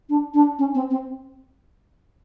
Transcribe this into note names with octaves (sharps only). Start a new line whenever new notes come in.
D4
D4
C#4
C4
C4